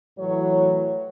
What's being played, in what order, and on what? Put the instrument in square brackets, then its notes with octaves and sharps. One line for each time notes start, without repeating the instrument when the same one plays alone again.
[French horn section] A2 E3 F#3 C#5